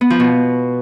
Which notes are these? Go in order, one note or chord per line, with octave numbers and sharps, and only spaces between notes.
B3
F3
B2